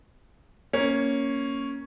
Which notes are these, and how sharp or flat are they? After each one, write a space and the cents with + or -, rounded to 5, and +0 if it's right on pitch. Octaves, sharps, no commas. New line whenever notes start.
A#3 +5 C#4 +0